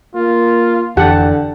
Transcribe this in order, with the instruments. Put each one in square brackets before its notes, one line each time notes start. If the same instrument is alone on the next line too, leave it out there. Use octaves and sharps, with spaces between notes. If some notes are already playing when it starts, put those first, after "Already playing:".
[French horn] A#3 [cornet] F4
[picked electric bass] F1 F2 E3 [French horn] D3 [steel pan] G4 F#5 [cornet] A5